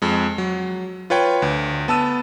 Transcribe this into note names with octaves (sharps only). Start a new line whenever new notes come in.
F2 G#3
F#3
F4 B4 C#5 G5
D2
B3 A5 E6 D#7